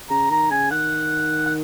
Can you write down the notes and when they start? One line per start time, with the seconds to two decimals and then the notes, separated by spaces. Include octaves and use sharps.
0.10 C#3 A#5
0.30 D#3 A#5
0.51 C#3 G#5
0.71 D#3 F#5
1.46 F#5